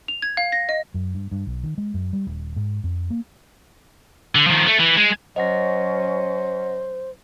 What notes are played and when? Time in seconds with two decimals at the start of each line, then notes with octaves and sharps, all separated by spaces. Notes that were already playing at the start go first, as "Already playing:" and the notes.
0.08 F7
0.22 G#6
0.37 F5
0.52 A#6
0.69 D#5
0.94 F#2
1.14 G2
1.31 G2
1.47 B1
1.63 D#3
1.78 G#3
1.94 F#2
2.13 G3
2.27 D#1
2.56 G#2
2.84 F2
3.10 A#3
4.35 D3
4.47 D#3 F3
4.67 A3
4.80 E3
4.97 G#3
5.36 F#3 C#4 C5 D#5 F#5 A#6